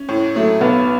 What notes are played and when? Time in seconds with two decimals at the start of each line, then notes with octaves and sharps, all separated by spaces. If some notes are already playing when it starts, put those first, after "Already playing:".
Already playing: C#4
0.09 A2
0.35 F#3 A3
0.61 B1 B3